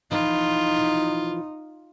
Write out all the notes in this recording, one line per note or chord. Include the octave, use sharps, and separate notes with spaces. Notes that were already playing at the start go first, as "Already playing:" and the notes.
E3 F3 D#4 F4